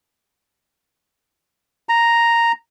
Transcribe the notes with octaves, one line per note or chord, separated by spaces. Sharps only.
A#5